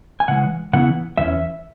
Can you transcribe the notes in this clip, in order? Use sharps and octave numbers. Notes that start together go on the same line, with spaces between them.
G#5
C#3 E3 G#3 F#5
C#3 E3 B3 E4 F#5
E2 E3 C#4 E5